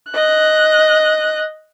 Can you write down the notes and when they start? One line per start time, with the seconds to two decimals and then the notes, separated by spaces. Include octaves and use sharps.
0.11 D#5 F#6